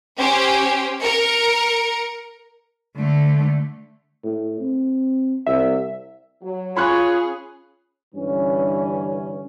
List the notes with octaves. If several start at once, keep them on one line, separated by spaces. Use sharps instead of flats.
C#4 G4 C5
A#4 C#7
D3 A3
A2
C4
C2 E5
F#3
C#4 F4 G#4 C#5 B5 C6 F#6
G2 D3 E3 C#4